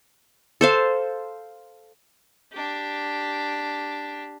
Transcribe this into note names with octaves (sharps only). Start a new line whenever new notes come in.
A4 C5 F5
D4 G4